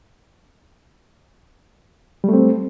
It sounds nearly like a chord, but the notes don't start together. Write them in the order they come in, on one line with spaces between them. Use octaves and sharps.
G3 A3 C4